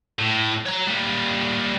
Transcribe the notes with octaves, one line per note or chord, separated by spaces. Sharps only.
A2
C#5 A#5
A#2 G3